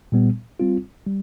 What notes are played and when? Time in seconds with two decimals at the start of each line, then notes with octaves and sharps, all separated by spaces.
0.12 A#2 G3 B3
0.60 G3 C4 F4
1.07 G3